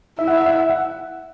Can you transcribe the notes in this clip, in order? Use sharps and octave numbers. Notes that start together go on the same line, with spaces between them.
E4 E5
F#5
E5
F#5
E5
F#5